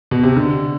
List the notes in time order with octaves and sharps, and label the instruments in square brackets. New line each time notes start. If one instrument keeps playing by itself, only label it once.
[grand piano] B2
C3
D3